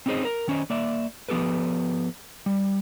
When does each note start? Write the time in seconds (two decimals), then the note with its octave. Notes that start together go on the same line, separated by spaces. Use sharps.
0.06 C4 C#4 D#4 G#4 C5 D#5
0.25 A#4
0.48 D#3 C#4 C5 D#5
0.70 A#3 D5 E5
1.29 F3 B3 G4 A4 B4
2.46 G3